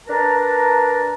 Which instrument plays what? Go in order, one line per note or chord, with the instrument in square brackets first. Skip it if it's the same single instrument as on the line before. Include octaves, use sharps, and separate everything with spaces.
[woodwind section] D4 A#4 B4 A5 A#5